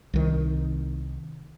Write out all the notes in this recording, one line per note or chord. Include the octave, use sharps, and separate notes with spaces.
C2 D#3